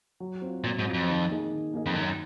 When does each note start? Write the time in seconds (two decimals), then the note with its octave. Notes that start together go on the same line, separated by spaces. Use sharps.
0.20 F#3
0.42 C4 F4
0.64 A#2 F#3
0.79 G#2
0.86 C4 F4
0.94 F2
1.08 D#3
1.30 A#3 D#4 G#4 D#5
1.52 D#3
1.74 A#3 D#4 G#4 D#5
1.86 F2
1.95 F#2 D#3